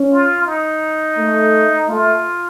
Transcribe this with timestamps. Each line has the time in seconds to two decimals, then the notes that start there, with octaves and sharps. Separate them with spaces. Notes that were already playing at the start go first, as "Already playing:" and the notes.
Already playing: C#4
0.12 F4
0.47 D#4
1.18 A3
1.89 A3 F4